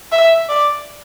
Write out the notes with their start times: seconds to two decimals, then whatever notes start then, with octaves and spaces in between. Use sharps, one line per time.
0.12 E5
0.49 D5